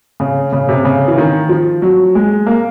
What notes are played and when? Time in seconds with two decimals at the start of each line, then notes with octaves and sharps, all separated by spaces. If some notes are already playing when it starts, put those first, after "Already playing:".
0.20 C#3
0.53 C#3
0.69 C3
0.85 C#3
1.08 E3
1.18 D#3
1.49 F3
1.82 F#3
2.15 G#3
2.46 A#3